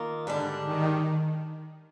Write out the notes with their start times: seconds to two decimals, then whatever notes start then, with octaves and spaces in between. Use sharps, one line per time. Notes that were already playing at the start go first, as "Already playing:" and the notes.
Already playing: D#3 A#3 F4 A#4
0.26 G#2 D3 G3 D4
0.63 D#3